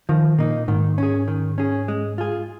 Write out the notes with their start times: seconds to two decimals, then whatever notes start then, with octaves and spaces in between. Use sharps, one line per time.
0.09 D#3 F3
0.39 A#2 A#3 D#4
0.68 G#2 D#3
0.98 C#4 G#4
1.28 D#3
1.58 C#4 G#4
1.88 G#3
2.18 F4 G#4